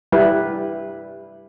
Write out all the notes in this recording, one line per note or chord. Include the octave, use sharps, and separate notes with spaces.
G3 E4 B4